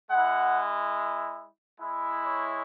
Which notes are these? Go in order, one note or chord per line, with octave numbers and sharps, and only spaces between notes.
G#3 E4 F#5
G#3 E4
C#5